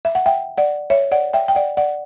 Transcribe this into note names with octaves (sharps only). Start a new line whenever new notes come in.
E5
F#5
E5 G5
D5 F#5
C#5 E5
D5 F#5
E5 G5
G5
D5 F#5
D5 F#5